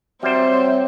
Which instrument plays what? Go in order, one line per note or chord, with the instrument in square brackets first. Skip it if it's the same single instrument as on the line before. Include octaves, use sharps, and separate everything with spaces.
[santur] F#3 A#5 [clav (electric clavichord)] G3 C5 [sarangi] C4 [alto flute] E5